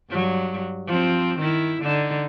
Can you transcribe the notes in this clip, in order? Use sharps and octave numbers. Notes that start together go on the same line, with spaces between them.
G2 F#3
F3 C4
D#3 E4
D3 D#4